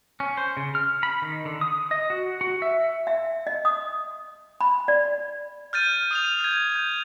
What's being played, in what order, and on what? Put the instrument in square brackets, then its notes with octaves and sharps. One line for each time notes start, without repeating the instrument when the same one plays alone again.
[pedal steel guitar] C#4
C5
C#3
F6
B5
D#3
D3
D#6
D#5
F#4
F#4
E5
[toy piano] E5
D#5
D#6
B5
D5
[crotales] F6 G6 A6 D#7
D#6 D#7 F7
G6 G#6
G6